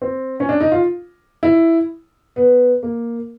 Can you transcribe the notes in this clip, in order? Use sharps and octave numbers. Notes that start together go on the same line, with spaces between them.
C4
C#4
D4
D#4
F4
E4
B3
A#3